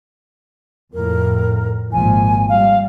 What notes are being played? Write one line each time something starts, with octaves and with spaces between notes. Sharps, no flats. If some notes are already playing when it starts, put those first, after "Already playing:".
F2 A2 A#4
G#1 A#2 F3 G#5
G3 F5